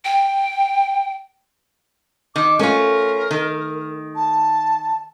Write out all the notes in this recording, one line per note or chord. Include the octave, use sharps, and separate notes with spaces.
G5
D#3 D6
A3 C#4 F4 A#4
D#3
A5